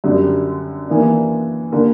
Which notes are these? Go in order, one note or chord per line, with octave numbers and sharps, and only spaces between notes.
F#2 D3 G3
E3 A#3 D4
D3 A#3